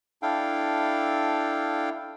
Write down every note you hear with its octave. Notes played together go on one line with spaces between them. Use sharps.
D4 E4 A4 F5 G5